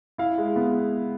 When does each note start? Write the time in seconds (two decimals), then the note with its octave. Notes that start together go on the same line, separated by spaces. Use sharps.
0.18 E4 F5
0.38 G#3
0.56 B3